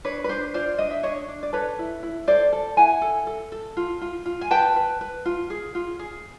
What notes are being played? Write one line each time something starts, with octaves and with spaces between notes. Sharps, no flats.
D4 B4 C#5
B4
D4 C5
F4 C5 D5
D4 D#5
E5
D4 C#5 D#5
D4
D5
A4 B4 C#5
E4
E4
A4 C5 D5
A4
E4 F#5 G#5
A4
A4
A4
F4
F4
F4
G#5
B4 G5 A5
B4
B4
F4
G#4
F4
G#4